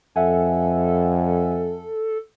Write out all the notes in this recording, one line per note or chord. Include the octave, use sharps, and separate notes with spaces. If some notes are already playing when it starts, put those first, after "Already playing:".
F2 A4 E5 F#5 G#5